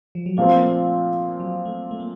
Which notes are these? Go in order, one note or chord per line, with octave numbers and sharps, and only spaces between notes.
F3
F#3
A#2 F3 A3 C4
A#3
A3
F#3
A3
A3
A#3